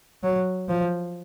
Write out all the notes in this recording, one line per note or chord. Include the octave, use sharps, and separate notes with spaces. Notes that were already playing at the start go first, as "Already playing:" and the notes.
F#3
F3